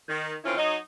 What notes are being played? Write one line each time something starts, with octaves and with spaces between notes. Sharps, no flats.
D#3
D3 D#3 C4 C#4 E4 F4
F#3 D#4 D#5